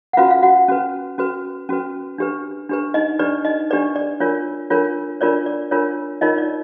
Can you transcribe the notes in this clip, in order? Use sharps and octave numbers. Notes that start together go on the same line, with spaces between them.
F#5
C#4 F4 F#4 B4 F5
F5
F#4 F#5
C#4 F#4 B4
C#4 F#4 B4
C#4 F#4 B4
D4 G4 B4
D4 G4 B4
D#4 D#5
D4 G4 B4 D5
D#4 D#5
D4 G4 B4 D5
D5
D4 F4 A#4 C#5
D4 F4 A#4 C#5
D4 F4 A#4 C#5 D5
D5
D4 F4 A#4 C#5
D#4 F4 A#4 C#5 D#5
D5